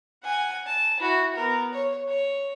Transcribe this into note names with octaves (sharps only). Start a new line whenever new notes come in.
F#5 G#5
A5
E4 F#4
B3 A#4
C#5
C#5